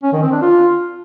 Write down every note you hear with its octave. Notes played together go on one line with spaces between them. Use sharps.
C#4
D#3
C4
D4
F4